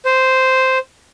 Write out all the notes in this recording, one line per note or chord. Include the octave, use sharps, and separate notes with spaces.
C5